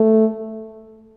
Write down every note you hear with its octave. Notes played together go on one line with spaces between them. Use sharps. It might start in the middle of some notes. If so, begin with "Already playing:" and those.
Already playing: A3